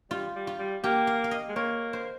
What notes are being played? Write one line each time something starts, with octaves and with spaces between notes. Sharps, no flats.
G3 F4
G3
F4
G3
A#3 G4
F5
F5
D#5
G#3
A#3 C#5
C5